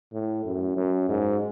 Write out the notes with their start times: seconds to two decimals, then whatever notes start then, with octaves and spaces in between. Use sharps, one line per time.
0.13 A2
0.45 F#2
0.77 F#2
1.09 G#2